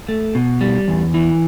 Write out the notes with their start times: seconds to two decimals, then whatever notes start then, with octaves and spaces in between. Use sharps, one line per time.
0.08 A3
0.35 B2
0.61 G3
0.88 E2
1.14 E3